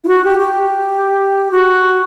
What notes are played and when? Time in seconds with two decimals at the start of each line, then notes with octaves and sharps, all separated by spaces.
0.04 E4
0.08 F#4
0.24 G4
0.40 G4
1.51 F#4